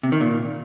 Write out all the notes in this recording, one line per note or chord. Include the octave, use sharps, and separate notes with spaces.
C3
D#3
A#2